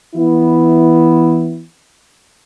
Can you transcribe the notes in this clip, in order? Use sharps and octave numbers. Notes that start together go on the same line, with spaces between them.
E3 B3 E4